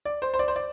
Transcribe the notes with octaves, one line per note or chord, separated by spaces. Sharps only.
D5
C5
C5
D5
C5
D5